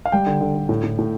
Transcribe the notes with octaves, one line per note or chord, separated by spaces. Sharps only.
F5
G3 G5
D3
D3
D3
A2
A2
A2